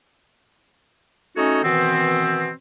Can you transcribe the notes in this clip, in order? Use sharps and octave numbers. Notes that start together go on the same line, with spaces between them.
A3 C#4 D#4 F#4 C#5 D#5
B2 D#3 E3 B3 C4